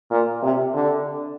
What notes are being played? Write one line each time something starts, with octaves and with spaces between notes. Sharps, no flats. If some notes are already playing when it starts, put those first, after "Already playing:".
A#2
C3
D3